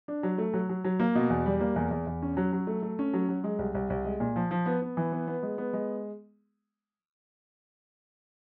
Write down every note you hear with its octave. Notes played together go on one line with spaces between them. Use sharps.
D4
F#3
A3
F#3
F#3
F#3
A#3
B2
E2
G3
A#3
E2
E2
E2
C#4
F#3
F#3
A3
A3
C#4
F#3
F#3
G#3
C2
C2
C2
G#3
A#2
F3
F3
B3
B3
E3
B3
B3
G#3
B3
G#3